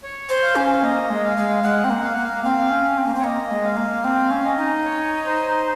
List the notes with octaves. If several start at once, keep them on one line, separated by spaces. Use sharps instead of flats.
C#5
C5
F5
C#4
A#3 D#5
G#3
F5
G#3
G#3 F#5
C4
A#3
F5
A#3 F#5
F5
C4 F5
C#4
C4
A#3
C4
C#5
A#3 D#5
G#3
F5
A#3
C4 F5
C#4
D#5
D#4
C#5
C5